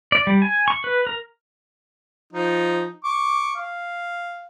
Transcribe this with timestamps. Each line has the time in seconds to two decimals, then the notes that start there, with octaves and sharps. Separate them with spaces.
0.12 D5
0.27 G3
0.42 G#5
0.68 C#6
0.84 B4
1.07 A#4
2.33 F3 D#4
3.04 C#6 D6
3.56 F5